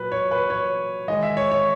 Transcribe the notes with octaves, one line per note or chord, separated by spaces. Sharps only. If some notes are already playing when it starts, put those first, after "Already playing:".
Already playing: A#2 F#3 A#3 B4
C#5
B4
C#5
D#3 G#3 D#4 D#5
E5
C#5
C#5